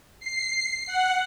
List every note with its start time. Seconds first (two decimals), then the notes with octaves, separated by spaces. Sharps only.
0.20 C7
0.86 F#5